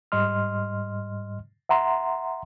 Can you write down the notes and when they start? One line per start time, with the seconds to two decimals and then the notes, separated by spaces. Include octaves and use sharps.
0.12 G#2 G3 D#5 C6 F6
1.69 E5 F#5 A#5 C6